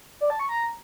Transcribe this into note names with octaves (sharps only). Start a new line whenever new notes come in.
D5
A5
C#6
A#5